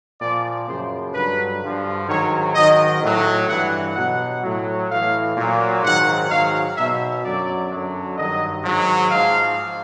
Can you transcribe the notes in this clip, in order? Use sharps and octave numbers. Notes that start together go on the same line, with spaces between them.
A#2 F3 D5
F#2 C#3 F3 C5
G2 D3 F#3 B4
G2 D3 F3
G#2 D#3 F#3 C#5
G#2 D#3 F#3 D#5
A2 F#3
G2 E3 F#5
B2 F#3 F#5
A2 F#3
A2 E3 F5
A#2 F#3
G#2 D#3 F#3 F#5
G#2 D#3 F#3 F5
B2 F#3 E5
F#2 D3 F#3 D5
F#2 D3 F#3
G2 D#3 F#3 D#5
G#2 D#3 F#3
G#2 F3 F5